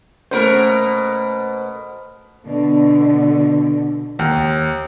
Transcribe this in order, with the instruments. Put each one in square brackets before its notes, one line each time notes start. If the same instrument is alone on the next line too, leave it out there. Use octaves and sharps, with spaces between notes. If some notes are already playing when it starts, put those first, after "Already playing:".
[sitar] B2 A#4 [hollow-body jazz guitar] A3 A#3 C#4 [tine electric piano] C5
[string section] B2 D3
[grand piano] D#2